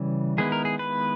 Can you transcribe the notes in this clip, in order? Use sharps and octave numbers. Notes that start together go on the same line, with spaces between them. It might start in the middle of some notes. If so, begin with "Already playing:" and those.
Already playing: C#3 E3 G3
D#3 G#3 B3 E4 G#4
A#4
G#4
B4